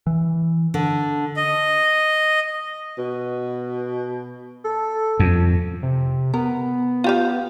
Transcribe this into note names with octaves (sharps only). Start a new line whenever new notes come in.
E3
D3
D#5
B2
A4
F2
C3
B3 A#4
F4 G4 F5